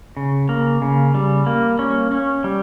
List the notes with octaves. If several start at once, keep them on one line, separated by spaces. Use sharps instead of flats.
C#3
A#3
C#3
G3
A#3
C#4
C#4
G3